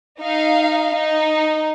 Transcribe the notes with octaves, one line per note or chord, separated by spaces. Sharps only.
D#4 F5
D#4